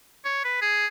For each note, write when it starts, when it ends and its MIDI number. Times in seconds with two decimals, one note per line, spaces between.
0.25 0.41 73
0.44 0.59 71
0.62 0.86 68